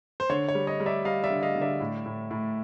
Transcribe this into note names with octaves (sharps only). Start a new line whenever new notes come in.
C5
D3 C#5
C#5
G3
C#5 D#5
G3
D5 E5
G3 D#5 F5
D5 E5
D3
D#5 F5
D3
D5 E5
A2
A2
A2